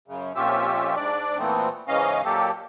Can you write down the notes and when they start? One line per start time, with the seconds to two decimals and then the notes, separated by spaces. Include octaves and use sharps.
0.08 F#2 C#3
0.36 F2 A#2 C#4 F4 G4 E5
0.95 G#2 D4 D5
1.38 A#2 E3 A3 B3 C4
1.88 G#2 C#3 E3 C#4 D#5 F5
2.24 A#2 F#3 A#3 G4 A4